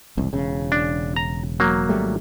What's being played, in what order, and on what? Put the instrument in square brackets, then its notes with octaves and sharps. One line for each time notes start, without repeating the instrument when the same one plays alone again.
[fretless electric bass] E1 C2
E1 C#3
[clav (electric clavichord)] D4
A#5
F#3 A#3
[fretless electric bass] G#1 G3 A3